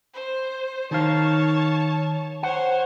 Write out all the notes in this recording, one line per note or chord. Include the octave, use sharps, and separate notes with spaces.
C5
D#3 D#4 C#5 F5 A5
C5 C#5 F#5